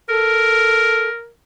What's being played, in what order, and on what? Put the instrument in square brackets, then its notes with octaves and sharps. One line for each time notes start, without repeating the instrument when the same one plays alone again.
[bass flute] A4 [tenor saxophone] A#4